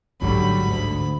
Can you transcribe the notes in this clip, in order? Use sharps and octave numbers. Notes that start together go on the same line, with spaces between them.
A1 G#2 D3 F#3 G3 B5
D2